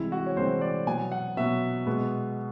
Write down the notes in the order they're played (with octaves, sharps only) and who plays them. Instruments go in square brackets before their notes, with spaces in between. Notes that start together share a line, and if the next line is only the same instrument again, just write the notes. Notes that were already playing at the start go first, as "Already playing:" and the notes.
Already playing: [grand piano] C2 C3 E3 G#3 C4 E4
F#4
C#5
C2 C3 E3 G#3 C4 C5
D5
B2 F#3 B3 G#5
F#5
B2 F#3 B3 E5
B2 G#3 B3